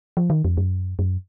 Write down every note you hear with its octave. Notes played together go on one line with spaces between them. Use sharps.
F3
D#3
F2
F#2
F#2